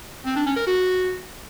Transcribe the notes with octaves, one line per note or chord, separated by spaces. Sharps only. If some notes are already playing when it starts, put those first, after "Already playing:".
C4
D4
C#4
A#4
F#4